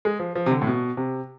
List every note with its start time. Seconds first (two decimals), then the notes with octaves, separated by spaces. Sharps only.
0.05 G#3
0.19 F3
0.35 F3
0.46 C3
0.51 D3
0.62 A2
0.67 B2
0.97 C3